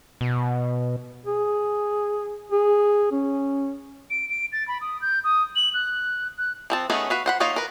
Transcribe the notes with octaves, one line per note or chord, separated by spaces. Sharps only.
B2
G#4
G#4
C#4
D7
D7
A6
B5
D#6
G6
D#6
F#7
F#6
F#6
F3 C4 A5
A3 B3 C#4 D#4 G#4
F#4 B4 F5
C5 F#5 B5
A#3 D#4 F4 C#5 F5
A#4 B4